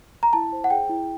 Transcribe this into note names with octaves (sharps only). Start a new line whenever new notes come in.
A#5
E4 A5
C5
F#5
G#4 G5
E4